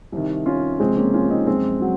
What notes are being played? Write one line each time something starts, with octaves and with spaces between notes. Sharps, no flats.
C2 C3 D#3
C#4 F4
C#2 C3 F3 G#3 C4
A#3 C#4
C#4 F4
C4 D#4
F#2 F3 G#3 C4
F#3